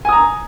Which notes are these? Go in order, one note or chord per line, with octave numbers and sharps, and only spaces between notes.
G#5 A#5 D#6